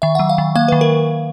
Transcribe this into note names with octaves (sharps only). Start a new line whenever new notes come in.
D#3 E5
F#3 F#5
F5
D#3
A#3 F5
D#3 B4
A#4